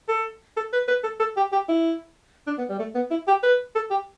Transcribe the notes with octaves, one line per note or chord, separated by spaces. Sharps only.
A4
A4
B4
B4
A4
A4
G4
G4
E4
D4
B3
G3
A3
B3
E4
G4
B4
A4
G4